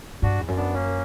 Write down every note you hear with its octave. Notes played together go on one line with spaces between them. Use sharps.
G2 D4 F#4
E2
F#2
B3 D4
A#3 C#4